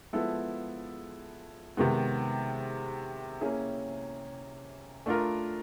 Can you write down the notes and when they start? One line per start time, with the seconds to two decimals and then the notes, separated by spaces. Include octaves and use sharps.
0.13 F3 G#3 B3 E4 A4
1.77 C3 D#3 G#3 B3
3.41 A#3 C#4 E4 G#4
5.06 A3 D4 F4 A#4